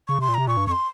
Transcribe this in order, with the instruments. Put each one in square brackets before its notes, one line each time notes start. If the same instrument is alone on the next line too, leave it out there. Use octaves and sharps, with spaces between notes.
[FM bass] C#3 [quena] C#6
[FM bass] C3 [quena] C6
[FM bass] A#2
[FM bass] C3 [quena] A#5
[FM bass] A#2 [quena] C#6
[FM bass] G2
[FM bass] F2 [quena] C#6
[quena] C6